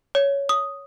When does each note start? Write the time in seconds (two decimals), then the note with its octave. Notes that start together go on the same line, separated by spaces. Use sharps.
0.15 C#5
0.49 D#6